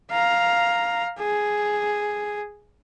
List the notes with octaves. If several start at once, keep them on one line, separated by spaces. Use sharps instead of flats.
F5 A#5
G#4